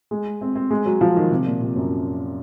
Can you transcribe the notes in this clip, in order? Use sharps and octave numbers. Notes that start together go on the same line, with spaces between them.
G#3
C4
C4
G#3
F#3
F3
D#3
C3
A#2
C3
F#2